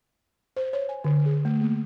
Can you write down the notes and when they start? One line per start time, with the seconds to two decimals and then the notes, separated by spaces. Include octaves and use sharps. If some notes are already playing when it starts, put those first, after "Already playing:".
0.57 C5
0.73 C#5
0.89 G#5
1.04 D3
1.26 G#4
1.45 A3
1.61 A#3